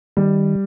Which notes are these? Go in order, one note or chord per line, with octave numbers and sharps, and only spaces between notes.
D#3 G3